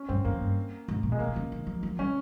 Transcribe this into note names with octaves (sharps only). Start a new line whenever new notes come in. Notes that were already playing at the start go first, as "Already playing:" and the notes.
Already playing: C#4
G2 C4
F2 A#3
G2
G#2
A#2
G#3
C3 A#3
D#3
C#3
D#3
F3
F3
G3 C#4